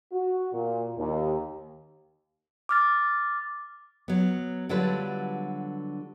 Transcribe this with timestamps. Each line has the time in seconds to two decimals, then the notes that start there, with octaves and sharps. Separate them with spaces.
0.12 F#4
0.53 A#2
0.98 D#2
2.69 D6 F6 A6
4.08 F#3 B3
4.69 D3 F#3 G3 F4 A4 B4